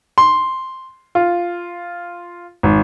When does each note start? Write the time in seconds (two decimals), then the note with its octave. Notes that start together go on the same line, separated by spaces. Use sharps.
0.18 C6
1.15 F4
2.63 G#1